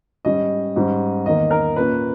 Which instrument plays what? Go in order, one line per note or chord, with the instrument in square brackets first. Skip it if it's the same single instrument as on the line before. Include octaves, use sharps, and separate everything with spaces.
[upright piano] G#2 G3 C#4 D#5
G#2 G3 C#4
E2 D#3 A#3 D#5
A#4
A#2 A#3 C#4 B4